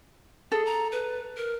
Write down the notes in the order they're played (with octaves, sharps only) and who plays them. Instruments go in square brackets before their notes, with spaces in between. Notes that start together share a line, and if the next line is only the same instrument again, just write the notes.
[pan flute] G#4 [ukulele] A4
[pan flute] A#5
B4
A#4